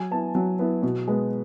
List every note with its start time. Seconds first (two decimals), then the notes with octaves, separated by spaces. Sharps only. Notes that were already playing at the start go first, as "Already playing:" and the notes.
Already playing: F#3 G#5
0.11 B3 E4 A5
0.35 F#3
0.59 B3 E4
0.83 B2
1.08 G#3 B3